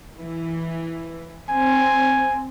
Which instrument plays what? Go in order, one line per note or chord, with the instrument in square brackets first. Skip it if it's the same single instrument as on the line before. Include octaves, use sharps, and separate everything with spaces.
[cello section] E3
[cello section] C4 [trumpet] G#5